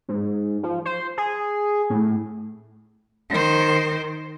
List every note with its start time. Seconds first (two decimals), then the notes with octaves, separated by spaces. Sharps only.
0.09 G#2
0.63 F3
0.85 C5
1.18 G#4
1.90 A2
3.30 D#3 C5